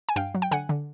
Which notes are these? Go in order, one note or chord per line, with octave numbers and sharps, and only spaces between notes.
G#5
G2 F5 G5
F#3
G5
D3 F#5 G#5
D3